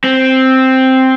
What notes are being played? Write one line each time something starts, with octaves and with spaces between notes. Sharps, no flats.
C4